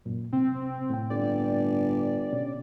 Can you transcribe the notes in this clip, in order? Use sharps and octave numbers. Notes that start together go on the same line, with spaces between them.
F#2 A#2
C3 C4
A2 G5
G1 D5
B2 C#4